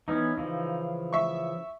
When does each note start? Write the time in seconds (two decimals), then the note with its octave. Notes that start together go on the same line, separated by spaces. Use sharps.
0.08 E3 B3 C#4 D#4
0.38 C#3 E3 F3
1.13 E5 C#6